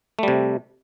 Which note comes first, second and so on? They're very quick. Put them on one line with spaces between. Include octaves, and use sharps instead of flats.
A3 G3 C3